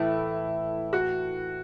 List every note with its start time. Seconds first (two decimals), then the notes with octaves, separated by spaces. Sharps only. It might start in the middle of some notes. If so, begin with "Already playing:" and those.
Already playing: A2 E3 A3 E4
0.93 F#4